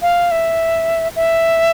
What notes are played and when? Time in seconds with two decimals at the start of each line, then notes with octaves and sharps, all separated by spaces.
0.02 F5
0.31 E5
1.16 E5